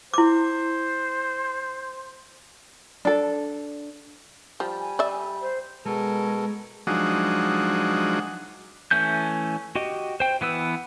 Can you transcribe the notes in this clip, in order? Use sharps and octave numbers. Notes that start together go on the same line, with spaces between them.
E4 C5 D6
D4 A4
F3 G3
G#5
D5 E5
C5
B2 G#3 A4 A#4
F3 F#3 G#3 D4 D#4 F#4
E3 A3 C#4 G6
F#4 G4 D#5
C5 G5
E3 B3 B4 E6